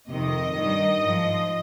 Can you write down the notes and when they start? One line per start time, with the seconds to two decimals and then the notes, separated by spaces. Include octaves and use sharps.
0.09 F2 C3 D#3 D#5
0.54 G2 D#3 G3
1.00 G#2 F3